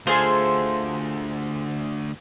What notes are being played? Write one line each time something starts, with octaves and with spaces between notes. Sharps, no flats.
D2 F4 G#4 A4 C5